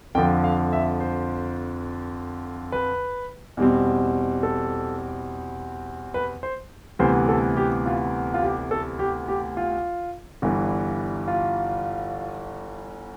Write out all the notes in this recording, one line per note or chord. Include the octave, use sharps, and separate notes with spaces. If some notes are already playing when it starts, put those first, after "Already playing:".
F2 D3 F3 G5
F5
E5
C5
B4
E2 B2 G3 C4
A4
B4
C5
D2 C3 E3 G3 B3 C5
A4
G4
F4
F4
G4
A4
G4
G4
F4
G1 G2 E3
F4